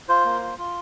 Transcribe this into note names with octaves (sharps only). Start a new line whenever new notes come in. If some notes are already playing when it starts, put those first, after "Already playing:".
F4 C5
A#3
F4
F4